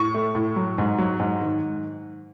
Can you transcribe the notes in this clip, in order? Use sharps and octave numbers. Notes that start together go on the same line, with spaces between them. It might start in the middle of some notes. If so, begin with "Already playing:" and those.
Already playing: A2 C#6
A3
A2
F#3
G#2
F#3
G#2
D#3